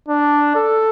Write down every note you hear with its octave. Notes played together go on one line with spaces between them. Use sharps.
D4
A4